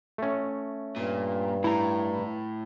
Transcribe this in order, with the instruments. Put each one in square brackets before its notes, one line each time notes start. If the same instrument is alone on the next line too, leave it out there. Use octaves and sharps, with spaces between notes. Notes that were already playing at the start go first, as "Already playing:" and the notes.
[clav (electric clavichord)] A3 C#4
[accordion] G2 [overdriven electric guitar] A#2
[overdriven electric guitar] A2 [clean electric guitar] E4 A#5